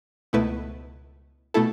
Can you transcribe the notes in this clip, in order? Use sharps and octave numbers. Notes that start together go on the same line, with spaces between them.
C#2 B2 A3 E4 B4
B2 A3 E4 A4